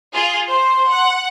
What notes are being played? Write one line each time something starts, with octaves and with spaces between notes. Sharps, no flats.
F4 G#4
C5 C6
F#5